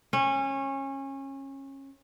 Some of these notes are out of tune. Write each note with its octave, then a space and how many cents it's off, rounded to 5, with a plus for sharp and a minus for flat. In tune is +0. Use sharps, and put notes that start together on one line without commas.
C#4 -25